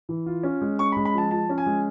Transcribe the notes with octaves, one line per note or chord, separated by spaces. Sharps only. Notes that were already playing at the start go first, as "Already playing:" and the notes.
E3
F4
C#4
G#3
C#4 C#6
B5
G#3
B5
F3 A5
F3 A5
C#4
G#5
G#3